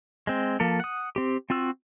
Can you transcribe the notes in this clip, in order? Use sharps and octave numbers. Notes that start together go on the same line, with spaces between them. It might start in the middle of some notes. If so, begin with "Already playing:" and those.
G#3 C4
F3 A#3 A4
F#5 D#6
C4 G4
C4 F4 F#4 E6